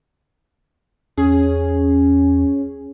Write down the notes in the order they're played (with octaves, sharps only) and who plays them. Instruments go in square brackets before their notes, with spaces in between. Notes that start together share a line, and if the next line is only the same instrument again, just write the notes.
[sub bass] E2 [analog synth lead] C#4 [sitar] G#4